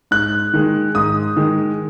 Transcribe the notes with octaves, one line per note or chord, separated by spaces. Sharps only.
G#2 F#6
D#3 G#3
G#2 D#6
D#3 G#3